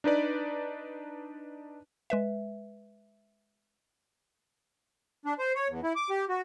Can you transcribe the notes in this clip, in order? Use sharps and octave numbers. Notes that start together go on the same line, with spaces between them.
D4 D#4 B4 D5
G#3 B4 E5
D4
C5
C#5
E2
E4
D6
G4
F#4